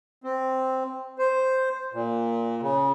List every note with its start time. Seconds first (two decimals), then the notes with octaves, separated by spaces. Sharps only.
0.24 C4
1.18 C5
1.93 A#2
2.62 C#3